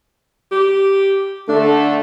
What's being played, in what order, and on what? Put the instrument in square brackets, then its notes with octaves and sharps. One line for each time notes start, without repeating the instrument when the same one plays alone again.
[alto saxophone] G4
[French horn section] D3 A3 A4 [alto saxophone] D4